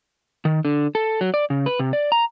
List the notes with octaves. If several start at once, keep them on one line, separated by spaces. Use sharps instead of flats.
D#3
D3
A4
F#3
D5
C#3
B4
C3
D5
A#5